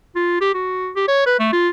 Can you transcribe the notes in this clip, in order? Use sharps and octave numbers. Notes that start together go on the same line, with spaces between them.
F4
G4
F#4
G4
C#5
B4
A3
F4